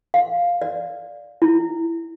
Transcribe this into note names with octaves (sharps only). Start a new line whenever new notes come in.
F5
D5
E4